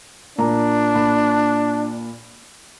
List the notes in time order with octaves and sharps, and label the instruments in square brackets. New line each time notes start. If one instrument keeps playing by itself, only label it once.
[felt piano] A#2 A#5 [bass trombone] D4
[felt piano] A#2 B5